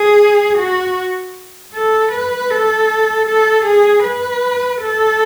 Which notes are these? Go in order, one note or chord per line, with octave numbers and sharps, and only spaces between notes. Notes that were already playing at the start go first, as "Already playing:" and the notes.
Already playing: G#4
F#4
A4
B4
A4
A4
G#4
B4
A4